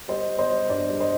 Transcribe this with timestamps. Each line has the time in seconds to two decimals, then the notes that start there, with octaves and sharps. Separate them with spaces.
0.08 G3 C5 D#5
0.29 G3
0.39 C5 D#5
0.48 G3
0.70 G2 D5
0.90 G3
1.00 C5 D#5